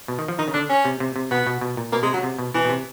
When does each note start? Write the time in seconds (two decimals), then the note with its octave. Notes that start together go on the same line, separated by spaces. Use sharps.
0.08 B2
0.19 D#3
0.28 F3
0.39 D#3 D#4
0.48 C#3
0.54 D3 D4
0.69 C#4
0.85 C3
1.00 C3
1.16 C3
1.31 B2 B3
1.47 B2
1.61 B2
1.77 A#2
1.92 B2 A#3
2.03 C3 G#3
2.13 C#3 F#3
2.23 C3
2.39 B2
2.54 B2 E3
2.65 B2
2.69 C3